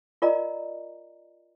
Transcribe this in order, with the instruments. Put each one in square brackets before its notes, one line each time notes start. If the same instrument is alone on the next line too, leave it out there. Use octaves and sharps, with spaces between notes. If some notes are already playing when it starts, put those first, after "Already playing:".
[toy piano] F4 A#4 D5 D#5 A#5